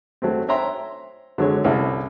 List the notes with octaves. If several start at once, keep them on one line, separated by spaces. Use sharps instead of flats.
F#3 A3 C4
C5 C#5 E5 G5 A#5 C6
D3 F#3 G#3 C#5
C2 C#4 E4 A4